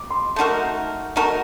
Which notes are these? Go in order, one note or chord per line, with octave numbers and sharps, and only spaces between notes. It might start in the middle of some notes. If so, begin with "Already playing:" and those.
Already playing: D6
C6
A3 D#4 F#4 A#4
A3 D#4 F#4 A#4 A#5